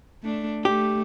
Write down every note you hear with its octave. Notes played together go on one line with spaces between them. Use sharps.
A3 D4
A3 G4